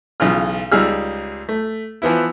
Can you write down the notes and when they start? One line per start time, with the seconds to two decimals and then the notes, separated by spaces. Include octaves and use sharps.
0.20 B1 C#3 E3 F4 F6
0.72 C#2 G3 D#4 G#4 E6 F6
1.49 A3
2.02 E3 F3 B3 E4